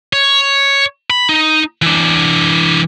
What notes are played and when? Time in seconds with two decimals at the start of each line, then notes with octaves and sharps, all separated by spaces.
0.13 C#5
1.10 B5
1.29 D#4
1.82 E3 D4